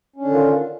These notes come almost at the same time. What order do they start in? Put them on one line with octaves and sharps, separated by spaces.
C#4 D4 D3 D#3 F4